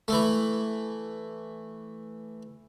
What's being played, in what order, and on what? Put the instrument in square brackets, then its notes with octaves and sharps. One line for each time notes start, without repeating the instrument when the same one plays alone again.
[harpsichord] E3 A3